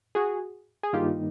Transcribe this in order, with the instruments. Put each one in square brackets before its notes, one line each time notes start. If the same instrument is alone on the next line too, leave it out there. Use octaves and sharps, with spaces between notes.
[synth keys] F#4 G#4
G#4
[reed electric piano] G2 D#3 G3 A#3 D#4 [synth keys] F4 G4